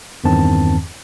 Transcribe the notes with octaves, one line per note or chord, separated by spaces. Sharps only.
E2 G2 D#3 C4 A5